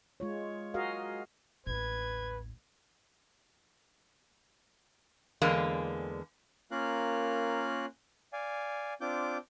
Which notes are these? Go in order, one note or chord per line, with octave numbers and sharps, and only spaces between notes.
G#3 F4 C#5
F#4 G#4 A#4 D#5 F5
A1 D#2 B4 G#6
E2 D3 G#3 A#3
A#3 C#4 F4 A#4 F5 F#6
D5 F5 G#5
C4 D4 F4 D6 G6